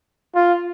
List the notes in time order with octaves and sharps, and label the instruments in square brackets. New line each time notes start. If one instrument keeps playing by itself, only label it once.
[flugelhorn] F4